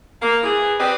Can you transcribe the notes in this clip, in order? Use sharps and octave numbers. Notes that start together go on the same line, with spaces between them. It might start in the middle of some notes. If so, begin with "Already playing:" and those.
A#3
E3 G#4
C4 G4 B4 D5 D#5